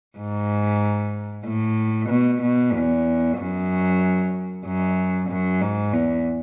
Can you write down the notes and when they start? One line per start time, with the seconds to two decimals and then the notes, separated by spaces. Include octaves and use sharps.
0.17 G#2
1.44 A2
2.09 B2
2.42 B2
2.73 E2
3.38 F#2
4.65 F#2
5.30 F#2
5.61 G#2
5.93 E2